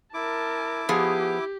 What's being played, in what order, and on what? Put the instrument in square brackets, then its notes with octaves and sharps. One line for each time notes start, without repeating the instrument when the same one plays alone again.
[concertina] E4 D6 [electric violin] A#4 A5
[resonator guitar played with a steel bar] F3 B3 G#4 [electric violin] G4